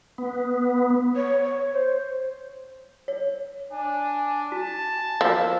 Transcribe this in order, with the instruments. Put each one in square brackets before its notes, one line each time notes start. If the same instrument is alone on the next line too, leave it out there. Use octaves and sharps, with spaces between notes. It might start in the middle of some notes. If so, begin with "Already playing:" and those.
[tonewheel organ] B3
[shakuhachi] C#5
C#5
C5
[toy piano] C#5
[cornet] D4 [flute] G#5
[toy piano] F#4 [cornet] A5
[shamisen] F3 [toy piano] F#4 A#4